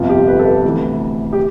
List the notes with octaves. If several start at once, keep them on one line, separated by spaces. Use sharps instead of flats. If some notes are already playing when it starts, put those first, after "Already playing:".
Already playing: G1 F2 C3 F4
G4
B4
A4
B4
D2 C3 E3
G4